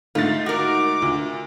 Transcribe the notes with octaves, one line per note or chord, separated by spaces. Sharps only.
G#2 D3 A3 F4 A6
F#4 A#4 D6
D2 F4